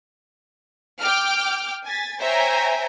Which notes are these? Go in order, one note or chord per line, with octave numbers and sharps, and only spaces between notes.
G5 D6 F6
G#5 A6 B6
C5 C#5 E5 G5 G#5 A#5